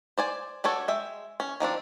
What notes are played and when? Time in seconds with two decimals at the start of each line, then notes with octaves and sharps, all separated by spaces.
0.18 C5 D5 G#5
0.64 D4 F#4 A4 C#5
0.88 G#3 E5 G5
1.40 C#4
1.60 D#3 F3 C4 D4